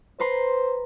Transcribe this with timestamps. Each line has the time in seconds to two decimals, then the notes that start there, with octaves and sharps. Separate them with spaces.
0.20 B4 C5 A#5 C6